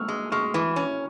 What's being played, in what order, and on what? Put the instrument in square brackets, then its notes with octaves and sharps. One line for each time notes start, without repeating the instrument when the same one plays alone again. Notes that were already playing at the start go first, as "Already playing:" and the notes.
Already playing: [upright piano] C#6 E6 F6
[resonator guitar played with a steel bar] G#3
[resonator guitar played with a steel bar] G#3 [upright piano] C#6 F6
[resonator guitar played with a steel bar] E3
C#4